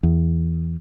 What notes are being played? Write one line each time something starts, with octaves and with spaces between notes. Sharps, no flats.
E2